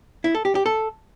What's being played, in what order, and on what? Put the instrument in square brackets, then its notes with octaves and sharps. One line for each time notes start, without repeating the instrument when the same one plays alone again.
[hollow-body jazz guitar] E4
A4
G4
G4
A4